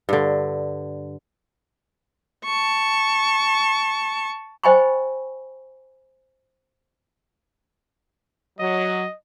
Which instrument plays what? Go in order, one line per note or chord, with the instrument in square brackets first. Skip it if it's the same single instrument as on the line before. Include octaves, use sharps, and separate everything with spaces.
[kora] G2 D3
[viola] A5 C#6
[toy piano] C5 D#5 G5 G#5 B5 C#6
[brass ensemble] F#3 [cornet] D#5